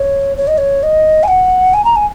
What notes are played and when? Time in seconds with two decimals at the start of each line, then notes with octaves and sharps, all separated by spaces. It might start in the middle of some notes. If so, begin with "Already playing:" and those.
Already playing: C#5
0.37 C#5
0.48 D#5
0.58 C#5
0.83 D#5
1.23 G#5
1.28 F#5
1.74 G#5
1.85 A#5
1.96 G#5